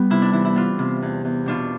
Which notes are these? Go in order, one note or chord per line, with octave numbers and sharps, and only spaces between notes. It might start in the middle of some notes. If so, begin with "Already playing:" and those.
Already playing: G3 B3 G4
C3 E4
D4
E3 E4
E4
B3 D4 F4
C3
E2
E2
B2 D4 F4